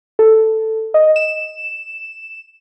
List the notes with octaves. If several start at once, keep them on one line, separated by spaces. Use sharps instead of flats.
A4
D#5
E7